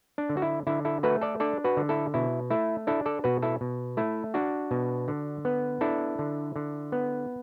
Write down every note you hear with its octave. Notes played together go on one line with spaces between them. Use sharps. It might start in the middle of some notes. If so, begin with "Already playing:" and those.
D4
D3
F#4
E4
D3 E4
E4 A4
A3 F#4 B4
A4 D5
D4 A4 D5
F#4 B4
D3
E4 A4
B2 E4
A3 E4
D4 E4 A4
A4 D5
B2 F#4 B4
E4 A4
B2
A3 E4
D4 F#4
B2
D3
B3
D4 E4 A4
D3
D3
B3